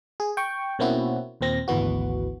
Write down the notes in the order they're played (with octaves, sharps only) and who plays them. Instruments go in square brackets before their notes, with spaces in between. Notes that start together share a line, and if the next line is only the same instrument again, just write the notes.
[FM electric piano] G#4
G5 C#6
B2 A#3 C4 C#4 E4 F#4
D#2 A#2 C4 A#6
G#1 D2 E3 B3 F#4